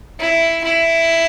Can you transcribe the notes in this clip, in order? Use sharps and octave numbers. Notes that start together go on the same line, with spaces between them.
E4
E4